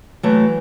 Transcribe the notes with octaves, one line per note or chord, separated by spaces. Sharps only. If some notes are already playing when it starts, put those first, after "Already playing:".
E3 F#3 A3